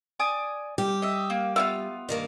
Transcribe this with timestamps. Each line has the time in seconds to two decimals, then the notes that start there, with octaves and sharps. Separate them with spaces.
0.19 D5 G#5 D#6
0.78 G3 G4
1.02 D#5 E5
1.30 A#3
1.56 B3 E4 F4 E5 F5
2.09 G2 D#3 A#3